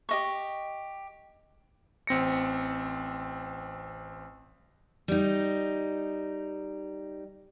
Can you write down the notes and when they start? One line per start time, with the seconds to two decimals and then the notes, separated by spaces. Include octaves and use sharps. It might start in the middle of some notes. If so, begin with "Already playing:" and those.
0.09 G4 D#5 C#6
2.07 A1 C4 A#6 C#7
5.08 G3 D#4